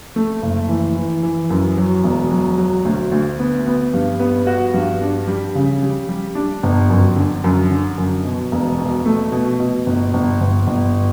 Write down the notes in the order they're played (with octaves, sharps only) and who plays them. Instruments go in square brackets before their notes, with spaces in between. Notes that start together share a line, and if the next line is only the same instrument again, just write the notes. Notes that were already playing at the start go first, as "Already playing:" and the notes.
[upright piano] A3
F#1
E3
E3
E3
F#2
F#3
E1
F#3
F#3
D2
D2
B3
B3
G2
B3
F#4
G2
D4
G3
C#3
G3
G3
D4
G1
F#2
D3
F#2
D3
F#2
B2
E1
B2
A3
B2
B2
G1
G1
G1
G1